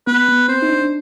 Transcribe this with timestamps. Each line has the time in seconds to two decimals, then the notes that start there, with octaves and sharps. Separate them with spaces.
0.07 B3 B4
0.28 B3
0.48 C4 C5
0.62 D#4
0.69 D4
0.81 D4